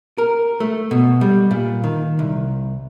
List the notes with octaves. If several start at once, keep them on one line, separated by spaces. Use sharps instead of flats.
A#4
A3
B2
G3
A#2
D#3
C2